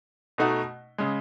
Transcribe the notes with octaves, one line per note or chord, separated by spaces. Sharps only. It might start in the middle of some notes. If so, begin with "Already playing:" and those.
B2 A3 D#4 F#4
C#3 G#3